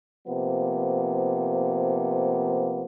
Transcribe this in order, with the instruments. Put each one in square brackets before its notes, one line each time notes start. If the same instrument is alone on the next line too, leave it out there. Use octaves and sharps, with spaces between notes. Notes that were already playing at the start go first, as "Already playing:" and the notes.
[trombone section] C3 F3 A#3 B3